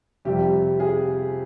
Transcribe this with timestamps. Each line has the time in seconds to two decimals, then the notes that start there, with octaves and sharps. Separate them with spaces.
0.25 F2 C3 G3 G4
0.80 G#4